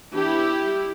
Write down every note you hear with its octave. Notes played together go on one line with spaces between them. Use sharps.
E3 B3 D4 E4 G4
G3